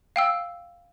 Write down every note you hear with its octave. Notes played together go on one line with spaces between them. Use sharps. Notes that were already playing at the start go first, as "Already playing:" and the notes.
F5 G5 E6